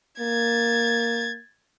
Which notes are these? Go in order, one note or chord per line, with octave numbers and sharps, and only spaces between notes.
A#3 G#6 A6